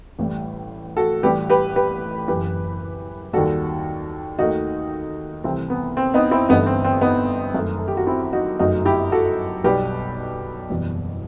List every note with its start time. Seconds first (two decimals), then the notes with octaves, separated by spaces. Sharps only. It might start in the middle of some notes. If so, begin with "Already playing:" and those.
0.19 A1 A2 G3
0.97 F#4 A4
1.23 A1 A2 G3 G4 B4
1.50 G4 B4
1.76 G4 B4
2.28 F#1 F#2 E3 G4 B4
3.33 D#2 D#3 G3 F#4 A4
4.39 D#2 D#3 A3 D#4 F#4
5.44 C2 C3 E3 A3 C4
5.70 B3
5.97 C4
6.14 B3 D#4
6.31 C4 E4
6.49 G1 G2 E3 A3 B3 D#4
6.67 C4
6.84 C4
7.01 B3 D#4
7.54 F#2 D#3 A3
7.78 A4
7.88 G4
7.97 F#4
8.07 C4 E4
8.33 D#4 F#4
8.59 G1 F#2 F#3 A3 D#4 F#4
8.85 E4 G4
9.12 F#4 A4
9.64 B1 B2 G3 G4 B4
10.70 F#1 E2 B2 G3